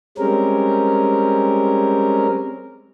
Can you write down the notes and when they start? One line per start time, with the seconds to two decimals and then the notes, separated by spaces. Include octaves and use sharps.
0.18 G3 G#3 C4 C#4 A#4